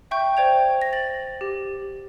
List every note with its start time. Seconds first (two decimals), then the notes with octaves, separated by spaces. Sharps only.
0.11 E5 G5 C#6 G6
0.37 C5 D5 G5 G#6 F7
0.82 A#6
0.93 A6 F#7
1.41 G4